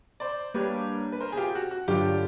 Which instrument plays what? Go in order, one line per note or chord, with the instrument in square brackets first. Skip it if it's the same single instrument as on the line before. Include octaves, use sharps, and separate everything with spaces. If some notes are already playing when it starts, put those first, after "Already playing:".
[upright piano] C5 D5
[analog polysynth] G3 A#3 D4 G4 [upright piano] B4 C#5
[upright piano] B4
A#4 C5
G#4
F4 G4
F#4
F#4
[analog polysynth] G2 D3 F#3 [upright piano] F4 G4